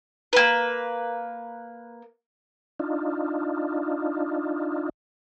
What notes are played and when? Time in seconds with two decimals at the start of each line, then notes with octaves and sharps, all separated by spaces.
0.33 A#3 B4
2.80 D4 D#4 F4